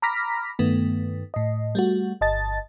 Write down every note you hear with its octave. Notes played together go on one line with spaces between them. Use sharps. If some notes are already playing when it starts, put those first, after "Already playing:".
A#5 B5 D6 F6 A#6 B6
G2 D#3 A3 B3
A2 D#5
G3 A3 F#4
G1 D#5 A5 A6